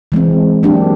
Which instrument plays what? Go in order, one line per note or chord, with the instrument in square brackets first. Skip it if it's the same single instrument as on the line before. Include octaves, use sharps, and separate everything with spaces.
[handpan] E3 G#3 C4
F#3 A#3 D4 G4